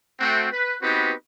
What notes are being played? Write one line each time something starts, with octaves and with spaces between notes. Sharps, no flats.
A3 C4 F#4
B4
B3 C4 D#4 F#4 G4 B4